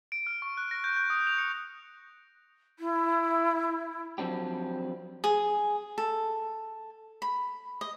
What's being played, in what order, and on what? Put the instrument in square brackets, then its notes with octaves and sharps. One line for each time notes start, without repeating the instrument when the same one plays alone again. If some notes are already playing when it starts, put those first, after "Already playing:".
[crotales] D7
F6
C#6
F#6
A#6
G6
G6
D#6
F7
C#7
[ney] E4
[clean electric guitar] F3 F#3 C4 D4 G4
[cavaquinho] G#4
A4
B5
D#5